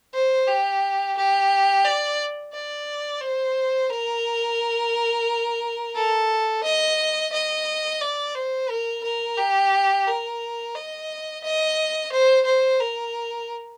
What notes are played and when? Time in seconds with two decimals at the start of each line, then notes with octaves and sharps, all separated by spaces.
0.14 C5
0.48 G4
1.17 G4
1.85 D5
2.53 D5
3.21 C5
3.90 A#4
5.95 A4
6.64 D#5
7.33 D#5
8.01 D5
8.35 C5
8.69 A#4
9.03 A#4
9.37 G4
10.07 A#4
10.75 D#5
11.44 D#5
12.12 C5
12.45 C5
12.80 A#4